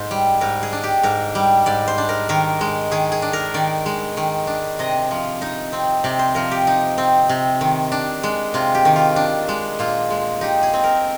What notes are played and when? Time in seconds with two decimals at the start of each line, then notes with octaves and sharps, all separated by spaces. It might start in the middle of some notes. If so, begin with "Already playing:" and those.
Already playing: G#2 C5
0.11 G3
0.41 G#2 A#4
0.63 G#4
0.72 D4
0.83 G4
1.03 G#2 A#4
1.35 G3
1.66 G#2 D5
1.88 C5
1.98 D4
2.09 A#4
2.29 D#3 A#4
2.61 G#3
2.91 D#3 G#4
3.12 G#4
3.22 D4
3.33 A#4
3.54 D#3 D5
3.86 G#3
4.17 D#3
4.47 D4
4.79 C3 D#5
5.11 F3
5.42 D#4
5.73 C4
6.04 C3 D5
6.19 C5
6.35 F3 A#4
6.51 G4
6.67 D#4
6.98 C4
7.29 C3
7.61 D#3
7.92 D4
8.23 G#3
8.54 C3 F4
8.75 G4
8.85 D#3
8.96 F4
9.16 D4
9.49 G#3
9.79 A#2 F4
10.10 G#3
10.41 D#4 G4
10.63 G#4
10.73 C4
10.84 A#4